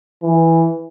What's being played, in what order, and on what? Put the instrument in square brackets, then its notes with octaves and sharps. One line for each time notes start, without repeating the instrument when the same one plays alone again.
[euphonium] E3